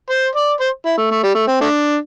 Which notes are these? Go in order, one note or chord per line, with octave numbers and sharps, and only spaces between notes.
C5
D5
C5
E4
A3
A3
G3
A3
C4
A3 D4